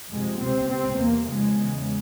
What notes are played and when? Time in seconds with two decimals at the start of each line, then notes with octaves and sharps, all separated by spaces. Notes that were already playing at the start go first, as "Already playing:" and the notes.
0.13 F2 C3 G#3
0.42 C#2 C3 C4
0.70 C#2 C3 C4
0.99 E2 C3 A#3
1.28 F2 C#3 G#3
1.57 E2 C#3